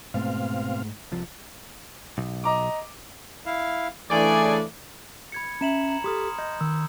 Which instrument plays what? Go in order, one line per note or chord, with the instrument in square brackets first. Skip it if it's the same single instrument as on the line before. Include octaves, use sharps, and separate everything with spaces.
[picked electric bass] G#2 A3 [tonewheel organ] B2 C4 F5
[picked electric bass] C2 C3 F3
[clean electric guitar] B1
[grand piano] D#5 A#5 D6
[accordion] E4 F5
[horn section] C#3 D5 G#5 [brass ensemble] E3 A3 D4 [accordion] G#4
[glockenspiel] B5 G#6 C#7
[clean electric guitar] C#4 E5 [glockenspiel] A#5 E7 F#7
[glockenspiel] A#5 F#7
[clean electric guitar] G4 A4 [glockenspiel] C6 D#6 F6
[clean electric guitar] D#5 [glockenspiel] G6
[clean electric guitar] D#3 [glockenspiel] E6